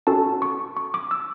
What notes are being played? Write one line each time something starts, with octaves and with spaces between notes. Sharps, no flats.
C#4 F#4 A4 A5
C#6
C#6
D6
E6